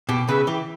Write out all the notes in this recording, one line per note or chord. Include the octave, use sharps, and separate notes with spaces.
B2 G4
C#3 B4 E5
E3 G4